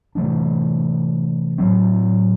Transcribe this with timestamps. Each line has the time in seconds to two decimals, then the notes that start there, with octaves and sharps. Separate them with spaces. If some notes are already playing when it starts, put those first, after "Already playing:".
0.15 C3 E3 A3 D4
1.58 A2 F#3 C4